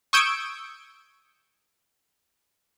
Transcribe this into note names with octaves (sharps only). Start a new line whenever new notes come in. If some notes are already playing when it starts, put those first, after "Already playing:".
C#6 D#6 E6 G6 G#6 D7